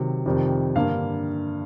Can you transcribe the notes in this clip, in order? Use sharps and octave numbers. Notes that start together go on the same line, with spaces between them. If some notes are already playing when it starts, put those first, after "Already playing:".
Already playing: C3 D#3 F#3
F2 C3 D#3 G3
G2 D3 G3 A#3 F5